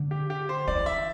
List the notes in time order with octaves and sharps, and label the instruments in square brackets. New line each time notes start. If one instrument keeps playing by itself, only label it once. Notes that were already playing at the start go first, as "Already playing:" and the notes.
Already playing: [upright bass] D3
[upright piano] G4
G4
C5
[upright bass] E3 [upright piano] D5
[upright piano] E5